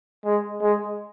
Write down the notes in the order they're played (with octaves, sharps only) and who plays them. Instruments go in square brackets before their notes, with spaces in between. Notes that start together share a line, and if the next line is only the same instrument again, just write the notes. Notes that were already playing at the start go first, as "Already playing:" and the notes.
[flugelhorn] G#3
G#3